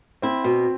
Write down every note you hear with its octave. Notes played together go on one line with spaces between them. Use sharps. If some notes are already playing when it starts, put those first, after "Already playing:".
C4 E4
B2